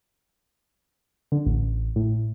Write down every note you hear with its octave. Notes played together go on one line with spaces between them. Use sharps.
D3
A1
A2